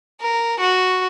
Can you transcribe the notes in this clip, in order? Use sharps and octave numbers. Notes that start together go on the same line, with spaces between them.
A#4
F#4